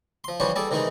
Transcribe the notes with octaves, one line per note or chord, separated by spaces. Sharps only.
F3 C6
E3 F3 G3 D4 C5 C#5
G3 G#4 A4 D5
C3 D#3 E3 G#3 D#4 G#4